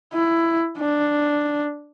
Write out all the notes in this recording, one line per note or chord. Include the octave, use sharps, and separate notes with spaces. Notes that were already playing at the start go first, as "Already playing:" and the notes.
E4
D4